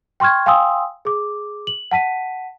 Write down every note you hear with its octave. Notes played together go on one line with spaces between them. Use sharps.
G5 C6 C#6 F6 G#6
F5 G5 G#5 C6 D#6 E6
G#4 D6
F#7
F#5 A5 B6 D#7